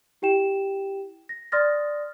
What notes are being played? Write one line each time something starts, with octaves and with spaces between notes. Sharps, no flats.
E4 G4 G5 E7
A#6
D5 C6 D#6 F6 A6 A#6